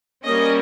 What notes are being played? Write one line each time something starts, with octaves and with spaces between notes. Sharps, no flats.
G3 A#3 C#4 D#5